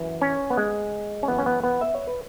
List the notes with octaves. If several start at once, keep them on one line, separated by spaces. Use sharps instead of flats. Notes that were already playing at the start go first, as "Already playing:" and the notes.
Already playing: F#2 E3
C#4
B3
G#3
C#4
F#2 E3 B3
C#4
B3
B3
E5
C#5
B4